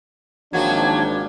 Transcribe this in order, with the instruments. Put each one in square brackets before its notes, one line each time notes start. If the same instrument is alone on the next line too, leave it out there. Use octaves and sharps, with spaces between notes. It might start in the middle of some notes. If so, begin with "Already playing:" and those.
[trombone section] G#1 D4 [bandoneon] D#3 F3 A#3 [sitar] F#3 F#4 [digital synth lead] G#6